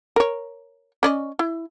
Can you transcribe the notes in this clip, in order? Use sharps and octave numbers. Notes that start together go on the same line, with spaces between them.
A#4 C#5
C#4 D5 D#5
E4